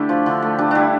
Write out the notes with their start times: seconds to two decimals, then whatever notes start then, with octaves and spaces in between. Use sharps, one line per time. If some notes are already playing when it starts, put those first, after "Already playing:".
Already playing: D3 A3 D4 E4 G4
0.09 F3
0.26 D3
0.42 A3
0.58 G3 D4
0.71 G3 D4 E4